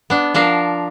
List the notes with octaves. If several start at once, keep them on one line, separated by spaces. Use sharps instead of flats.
B3 D4
F3 D4 A#4 F5